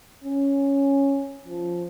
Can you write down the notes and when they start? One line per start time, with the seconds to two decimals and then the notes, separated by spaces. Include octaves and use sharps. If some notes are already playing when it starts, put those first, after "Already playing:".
0.24 C#4
1.46 F3